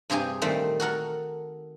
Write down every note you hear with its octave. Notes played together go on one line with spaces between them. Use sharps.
G2 C3 G4 G#4 G#5
A#2 D#3 G3 A3 C4
F#4 A4 A#4 F#5